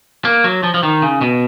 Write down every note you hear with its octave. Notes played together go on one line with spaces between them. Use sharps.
A#3
F#3
F3
F3
D#3
C#3
B2